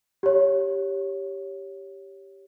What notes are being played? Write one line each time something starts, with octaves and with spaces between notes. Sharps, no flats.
G4 C#5